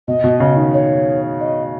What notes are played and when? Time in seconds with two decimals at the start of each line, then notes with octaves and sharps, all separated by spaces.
0.07 B2 D#5
0.24 B2
0.40 C#3
0.56 D#3
0.73 C#5
1.40 D#5